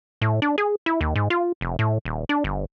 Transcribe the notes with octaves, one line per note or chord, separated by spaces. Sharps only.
A2
D4
G#4
E4
D#2
G#2
F4
F1
A2
D#1
D4
G1